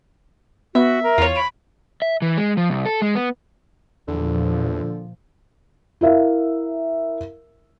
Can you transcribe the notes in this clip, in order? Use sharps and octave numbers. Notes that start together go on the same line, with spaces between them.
B3 F#4 E5
A#4
E2 F4 C#5
B5 D7
E5
E3
G#3
F3
C2
A4
G#3
B3
E2 A#2 D3 F3
E4 A#4 E5 F5